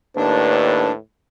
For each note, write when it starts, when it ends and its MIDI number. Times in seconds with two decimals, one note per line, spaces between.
0.17 0.89 39
0.17 0.97 45
0.17 0.92 62
0.17 0.93 71